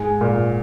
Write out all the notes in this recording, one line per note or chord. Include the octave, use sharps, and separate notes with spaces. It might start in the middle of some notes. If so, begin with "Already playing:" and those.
Already playing: G#2 G#3 G#5
A#2